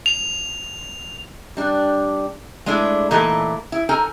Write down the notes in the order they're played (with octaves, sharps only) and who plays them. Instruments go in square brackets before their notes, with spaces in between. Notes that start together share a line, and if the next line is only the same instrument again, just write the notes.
[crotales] F7
[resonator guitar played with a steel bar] G3 D4
G#3 A3 D4 E4 G#4
A#2 E3 A3 D#4 A4 A#4
E4
D#4 A4 A#4 G#5